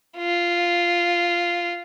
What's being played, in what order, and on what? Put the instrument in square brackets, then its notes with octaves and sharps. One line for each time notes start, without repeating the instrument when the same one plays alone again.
[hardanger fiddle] F4